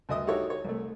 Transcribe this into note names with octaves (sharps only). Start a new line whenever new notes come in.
D2 G2 D#5 E5 D#6
D#4 E4 F#4 G4 A4 C#5
C#5
C2 A3